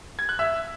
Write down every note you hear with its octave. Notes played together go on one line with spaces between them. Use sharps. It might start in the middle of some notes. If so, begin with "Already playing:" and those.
G#6
F#6
E5 E6